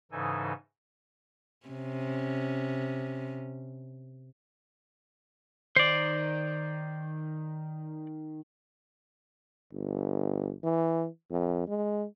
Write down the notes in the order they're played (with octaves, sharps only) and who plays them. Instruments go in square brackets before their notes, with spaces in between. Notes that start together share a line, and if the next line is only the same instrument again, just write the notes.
[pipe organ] G#2 C#3 E3 D#4 A4 G#5
[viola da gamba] C3 C#4
[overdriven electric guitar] D#3 [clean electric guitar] C5 D5
[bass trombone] G1
E3
F2
G#3